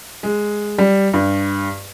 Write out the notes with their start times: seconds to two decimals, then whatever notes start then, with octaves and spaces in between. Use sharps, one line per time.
0.23 G#3
0.78 G3
1.14 G2